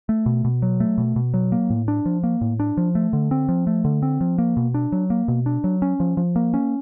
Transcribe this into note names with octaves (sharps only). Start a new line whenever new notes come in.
A3
B2
B2
F#3
A3
B2
B2
F#3
A#3
A2
D4
F3
A#3
A2
D4
F3
A3
D3
C4
F3
A3
D3
C4
F3
A#3
B2
D4
F#3
A#3
B2
D4
F#3
C#4
F3
F3
A#3
C#4